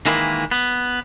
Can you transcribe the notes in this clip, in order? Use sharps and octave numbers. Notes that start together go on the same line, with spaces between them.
D#3 E3 G#3 A#3 E4
B3